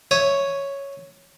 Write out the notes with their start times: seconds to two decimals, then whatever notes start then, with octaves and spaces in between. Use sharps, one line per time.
0.11 C#5 E5 D#6